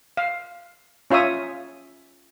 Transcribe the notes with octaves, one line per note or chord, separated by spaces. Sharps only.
F5
C#4 F4 C#5 E5 D#6